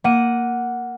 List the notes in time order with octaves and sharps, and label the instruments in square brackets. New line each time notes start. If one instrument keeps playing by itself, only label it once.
[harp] A#3 F#5 D#7